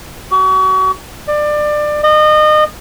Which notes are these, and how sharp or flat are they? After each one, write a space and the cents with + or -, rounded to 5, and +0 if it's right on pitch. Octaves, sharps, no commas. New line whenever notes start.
F#4 +35
D5 +25
D#5 -30